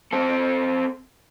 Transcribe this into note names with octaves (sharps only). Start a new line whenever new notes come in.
C4 A4